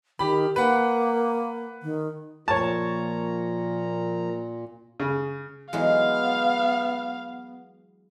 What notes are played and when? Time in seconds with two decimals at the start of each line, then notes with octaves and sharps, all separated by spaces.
0.19 D#3 G4 B5
0.56 A#3 B4 F#5
1.82 D#3
2.48 A#2 F3 A#3 C#5 A5 A#5
5.00 C#3
5.73 E3 F#3 G#3 B3 F5